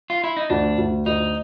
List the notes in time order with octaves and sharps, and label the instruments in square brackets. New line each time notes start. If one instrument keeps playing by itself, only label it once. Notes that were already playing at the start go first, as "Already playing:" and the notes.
[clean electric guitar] F4
E4
D#4
[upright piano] D2 [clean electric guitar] D4
[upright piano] D2
[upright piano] D2 [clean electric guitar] D#4